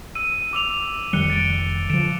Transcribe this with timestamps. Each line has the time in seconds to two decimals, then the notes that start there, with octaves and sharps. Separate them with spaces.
0.15 E6 D#7
0.53 D6 E6 F7
1.13 F1 D#3 G3 F#6 C#7 G7
1.30 A6 D7
1.90 D3 F3 D7 E7